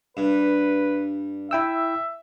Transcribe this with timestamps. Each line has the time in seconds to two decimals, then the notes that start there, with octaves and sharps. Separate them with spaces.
0.17 G2 B4
1.51 E4 E5 G5 E6